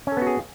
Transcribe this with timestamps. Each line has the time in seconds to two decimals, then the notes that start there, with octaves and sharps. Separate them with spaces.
0.07 C#4
0.12 A4
0.17 B3
0.22 F#4
0.27 G#4